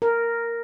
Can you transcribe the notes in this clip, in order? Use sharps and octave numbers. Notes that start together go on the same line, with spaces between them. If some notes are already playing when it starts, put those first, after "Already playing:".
A#4